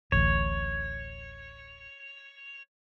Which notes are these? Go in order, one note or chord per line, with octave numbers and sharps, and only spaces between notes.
D1 A1 C#5